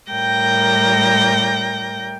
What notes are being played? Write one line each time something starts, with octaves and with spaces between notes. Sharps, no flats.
A2 G3 A#4 G5 G6 A#6